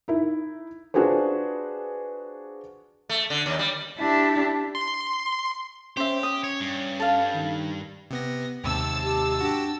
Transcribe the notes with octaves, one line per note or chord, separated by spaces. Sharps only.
D#4 E4
D4 F4 F#4 G#4 B4 C5
A3
D3
D#2
G3
D4 E4 G4 E5 A5
C6
C#4 G4 C5 E5
D#6
C#5
G2
A4 F5
D#3
C3 B3 A#6
D#2 G#2 C3 A5 E6
G4
D4 F#4 G4